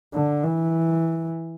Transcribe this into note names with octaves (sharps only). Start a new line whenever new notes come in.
D3
E3